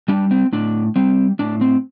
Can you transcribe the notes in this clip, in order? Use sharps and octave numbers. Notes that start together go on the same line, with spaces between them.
G3 D4
C4
A2 D4
G3 C4
A2 D4
C4